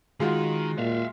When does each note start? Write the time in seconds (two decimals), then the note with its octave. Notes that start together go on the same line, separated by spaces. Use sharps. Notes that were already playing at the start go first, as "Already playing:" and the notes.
0.20 D#3 G#3 F4 F#4
0.78 A#2 E5 F5